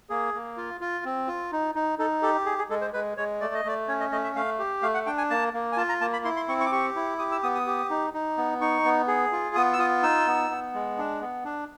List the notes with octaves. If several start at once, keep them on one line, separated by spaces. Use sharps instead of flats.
A#3 G#4
A#3
F4
F4
C4
F4
D#4
D#4
D#4 A4
G4 A4
G#4
G#4
G#3 A4
C5
G#3 B4
G#3 C#5
A3 D5
D#5
A3 D5
C#4 C#5
D#5
A3 D#5
E5
A3 F5
G4
A3 F5
F#5
D4 G5
G#5
A#3 A5
A#3
G#5
F4 A5
A#5
A#3 A5
B5
E4 C6
C6
C4 C#6
C#6
D6
G4 C#6
E4
G4 D#6
E6
B3 D#6
D#6
G4
D#4
D#4
B3
D#4 C#6
B3
G#4
F4
B3 D#6
E6
F4 D#6
D#4 E6
B3
B3
G#3
D4
B3
D4